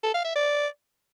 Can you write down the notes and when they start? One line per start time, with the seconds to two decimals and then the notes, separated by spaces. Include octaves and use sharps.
0.03 A4
0.14 F5
0.25 E5
0.35 D5